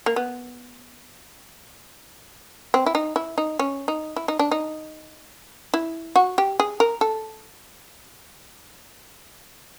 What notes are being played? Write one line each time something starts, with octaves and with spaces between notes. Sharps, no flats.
A#3
B3
C4
E4
D#4
E4
D#4
C#4
D#4
E4
D#4
D4
D#4
E4
F#4
G4
G#4
A#4
A4